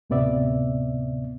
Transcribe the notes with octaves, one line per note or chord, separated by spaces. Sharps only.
D2 A2 C3 B3 D5 E5